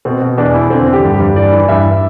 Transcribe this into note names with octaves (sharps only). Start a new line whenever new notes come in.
B2 C4
B2
E2 D4
E2 E4
D3 C4
D3
G4
G2
G4
G2
E3 D5
E3
G2 E5